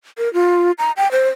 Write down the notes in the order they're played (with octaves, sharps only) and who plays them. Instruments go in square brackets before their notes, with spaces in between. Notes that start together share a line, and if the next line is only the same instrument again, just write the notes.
[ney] A#4
F4
A#5
G5
C5